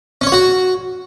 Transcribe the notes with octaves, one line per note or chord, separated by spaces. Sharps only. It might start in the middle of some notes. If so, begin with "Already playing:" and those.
C#4
C#5
F#4